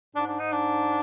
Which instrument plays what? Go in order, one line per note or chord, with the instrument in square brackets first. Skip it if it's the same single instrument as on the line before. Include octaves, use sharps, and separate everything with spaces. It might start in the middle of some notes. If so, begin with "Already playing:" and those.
[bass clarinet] G#2 [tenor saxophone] D4
[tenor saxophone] D4
D#4
D4